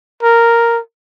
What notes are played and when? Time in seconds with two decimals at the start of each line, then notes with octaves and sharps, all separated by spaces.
0.23 A#4